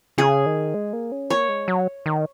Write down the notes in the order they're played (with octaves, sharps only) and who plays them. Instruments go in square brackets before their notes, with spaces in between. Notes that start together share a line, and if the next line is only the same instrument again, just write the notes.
[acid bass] C#3 [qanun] G#4
[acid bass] D#3
G#3
A#3
C#4
[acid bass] A#3 [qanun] C#5
[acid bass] G#3
F#3
D#3